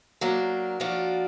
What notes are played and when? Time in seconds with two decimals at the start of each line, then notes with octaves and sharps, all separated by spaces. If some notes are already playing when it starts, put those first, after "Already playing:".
0.21 F#3 A#3 D4
0.80 F3 A#3 D4 F#4